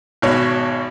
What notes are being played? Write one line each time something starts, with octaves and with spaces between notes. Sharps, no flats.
G#1 B2 C#5